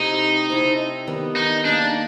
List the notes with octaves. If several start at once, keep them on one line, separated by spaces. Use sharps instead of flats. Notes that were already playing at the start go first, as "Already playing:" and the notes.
Already playing: C3 A3 C4 D#4 E4 G4
C4 E4 A4
D#3 G3 B3
D#4
A#3 D4 D#4 G#4